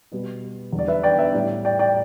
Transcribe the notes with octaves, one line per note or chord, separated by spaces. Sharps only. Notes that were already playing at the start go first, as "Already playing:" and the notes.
B2 G3 B3
E2 D3 G3
D5
B4 E5
D5 G5
B4 E5
A2 G3 E4
D5 G5
D5 G5